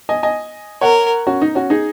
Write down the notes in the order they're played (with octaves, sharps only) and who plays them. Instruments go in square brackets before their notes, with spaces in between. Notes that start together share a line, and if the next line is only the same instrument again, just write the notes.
[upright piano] D#5 G#5
D#5 G#5
[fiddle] A#4 [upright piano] C#5 F#5
[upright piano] C#4 F#4
D#4
C#4 F#4
D#4 G#4